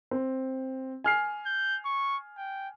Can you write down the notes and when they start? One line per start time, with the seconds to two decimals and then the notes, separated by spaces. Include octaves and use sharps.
0.11 C4
1.04 G#5 F6 C7
1.46 G6
1.85 C#6
2.37 G5